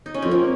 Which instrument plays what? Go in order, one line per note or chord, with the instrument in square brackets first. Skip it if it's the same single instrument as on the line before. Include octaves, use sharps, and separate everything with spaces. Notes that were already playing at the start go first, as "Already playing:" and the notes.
[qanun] D#4
C#4
[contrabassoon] F2 [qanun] C4
[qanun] A#3